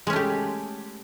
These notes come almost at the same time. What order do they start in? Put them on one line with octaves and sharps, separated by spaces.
G#3 C#4 A3 G4